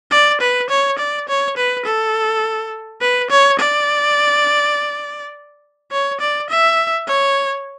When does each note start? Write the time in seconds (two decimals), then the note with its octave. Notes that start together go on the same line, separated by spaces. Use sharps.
0.11 D5
0.41 B4
0.70 C#5
0.98 D5
1.28 C#5
1.57 B4
1.86 A4
3.01 B4
3.30 C#5
3.59 D5
5.92 C#5
6.20 D5
6.50 E5
7.07 C#5